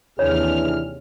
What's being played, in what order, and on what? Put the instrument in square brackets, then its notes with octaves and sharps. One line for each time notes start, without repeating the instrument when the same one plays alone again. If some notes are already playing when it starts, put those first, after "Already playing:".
[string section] D#2 C3 F6 [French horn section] E3 D4 G#4 [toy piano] C#5